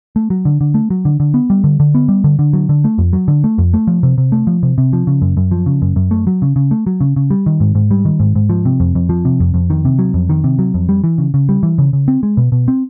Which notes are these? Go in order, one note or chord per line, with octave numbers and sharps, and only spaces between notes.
A3
F#3
D3
D3
A3
F#3
D3
D3
B3
G3
D3
D3
B3
G3
D3
D3
F#3
D3
A3
F2
F#3
D3
A3
F2
A3
F3
C3
C3
A3
F3
C3
C3
F3
C#3
F#2
F#2
F3
C#3
F#2
F#2
A3
F#3
C#3
C#3
A3
F#3
C#3
C#3
G3
D#3
G#2
G#2
G3
D#3
G#2
G#2
F3
C3
F2
F2
F3
C3
F2
F2
D#3
C3
F#3
F2
D#3
C3
F#3
F2
G3
E3
C#3
C#3
G3
E3
C#3
C#3
C4
G#3
B2
B2
C4